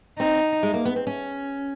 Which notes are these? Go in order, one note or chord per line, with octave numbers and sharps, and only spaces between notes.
C4 D#4
G#3
A#3
B3
C4
C#4